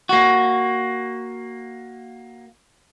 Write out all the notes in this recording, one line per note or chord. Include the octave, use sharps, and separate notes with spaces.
A#3 F#4